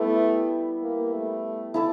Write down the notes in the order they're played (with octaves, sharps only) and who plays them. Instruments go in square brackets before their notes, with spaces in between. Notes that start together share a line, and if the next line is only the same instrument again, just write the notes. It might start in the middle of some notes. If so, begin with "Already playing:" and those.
Already playing: [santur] G3 B3 E4 [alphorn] A3
[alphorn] A#3
A3
[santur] E4 A4 D5